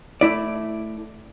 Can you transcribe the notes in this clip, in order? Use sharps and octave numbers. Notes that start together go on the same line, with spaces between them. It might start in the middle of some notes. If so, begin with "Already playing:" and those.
A3 E4 D5